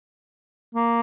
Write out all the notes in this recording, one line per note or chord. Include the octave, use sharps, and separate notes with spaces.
A#3